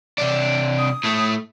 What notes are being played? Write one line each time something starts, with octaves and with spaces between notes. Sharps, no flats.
C3 D4
D#6
A2 A3